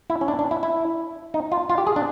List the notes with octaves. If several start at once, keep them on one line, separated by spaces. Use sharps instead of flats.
E4
C#4
D4
D4
E4
E4
D#4
F4
F4
G4
G#4
D4